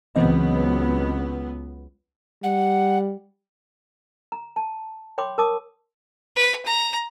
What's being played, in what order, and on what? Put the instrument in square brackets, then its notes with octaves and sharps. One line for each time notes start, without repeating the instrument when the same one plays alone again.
[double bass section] C#2 F#3 B3 [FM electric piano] E3 C4 D#5
[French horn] G3 [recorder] F#5
[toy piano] A#5
A5
C#5 G5 B5 C6 D6
A#4 A5 D6 D#6
[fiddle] B4
A#5